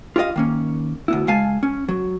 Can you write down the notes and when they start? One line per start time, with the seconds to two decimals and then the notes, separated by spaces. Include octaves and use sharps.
0.16 F4 G4 A#4 D#5 F5
0.36 D#3 A#3 C#4
1.08 D2 B3 E4
1.27 C#3 G#3 F5 G#5 A5
1.63 C#4
1.88 F#3